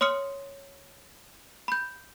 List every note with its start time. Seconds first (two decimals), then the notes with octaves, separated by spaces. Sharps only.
0.01 C#5 C6 D#6 F6 C#7
1.68 B5 G6